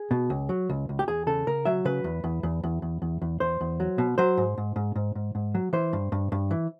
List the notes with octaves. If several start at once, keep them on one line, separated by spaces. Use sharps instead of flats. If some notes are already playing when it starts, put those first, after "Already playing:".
Already playing: G#4
B2
C#2
F#3
C#2
C#2
G4
E2 G#4
C#3 A4
C#3 A#4
F#3 E5
C#3 B4
E2
E2
E2
E2
E2
E2
E2
E2 C5
E2
F#3
B2
F#3 C5
G#2
G#2
G#2
G#2
G#2
G#2
F#3
E3 C5
G2
G2
G2
E3